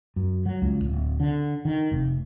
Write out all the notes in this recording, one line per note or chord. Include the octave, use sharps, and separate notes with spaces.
F#2
F#3
C#2
D1
D3
D#3
F1